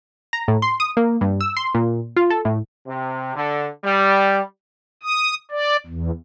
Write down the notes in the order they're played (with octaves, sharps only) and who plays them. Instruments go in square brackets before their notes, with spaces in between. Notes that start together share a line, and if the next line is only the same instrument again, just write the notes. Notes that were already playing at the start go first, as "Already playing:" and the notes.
[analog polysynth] A#5
A2
C6
D#6
A#3
G2
E6
C6
A#2
F4
A4
A2
[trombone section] C3
D3
G3
[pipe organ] D#6
D5
E2